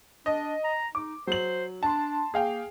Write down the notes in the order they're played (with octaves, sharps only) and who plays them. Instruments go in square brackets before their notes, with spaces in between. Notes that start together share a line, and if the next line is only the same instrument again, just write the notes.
[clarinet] D4 [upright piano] D#5
[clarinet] A#5
[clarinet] D#4 [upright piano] D6
[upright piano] F#3 F#7 [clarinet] C5
[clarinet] D4 [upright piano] A5 C6
[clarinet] A#3 [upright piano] G#4 F5 G5